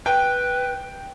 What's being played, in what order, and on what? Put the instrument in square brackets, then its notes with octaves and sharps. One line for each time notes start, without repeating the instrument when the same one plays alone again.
[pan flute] B4 [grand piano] G5